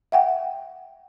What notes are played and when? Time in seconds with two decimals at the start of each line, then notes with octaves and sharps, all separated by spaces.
0.12 E5 F#5 G5